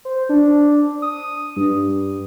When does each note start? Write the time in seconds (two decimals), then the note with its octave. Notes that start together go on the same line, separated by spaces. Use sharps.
0.05 C5
0.29 D4
1.02 D#6
1.56 G2